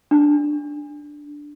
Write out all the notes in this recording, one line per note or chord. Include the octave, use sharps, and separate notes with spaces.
D4